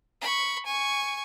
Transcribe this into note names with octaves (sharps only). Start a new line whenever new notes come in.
B5 C#6
G#5 C#6